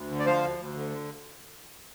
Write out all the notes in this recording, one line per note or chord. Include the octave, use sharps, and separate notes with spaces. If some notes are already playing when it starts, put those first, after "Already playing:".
Already playing: D2
D3
D5
F3 C5 F5
D2
D2
D3